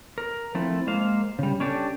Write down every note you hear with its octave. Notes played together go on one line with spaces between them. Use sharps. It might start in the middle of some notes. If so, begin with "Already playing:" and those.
A#4
F3 A3 C4 E4
G#3 A#3 C5 F5
C#3 G3
C#4 D4 G4 A4